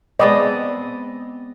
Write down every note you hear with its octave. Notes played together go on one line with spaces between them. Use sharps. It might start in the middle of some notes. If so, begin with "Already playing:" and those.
G#3 B3 C4 D5 D#5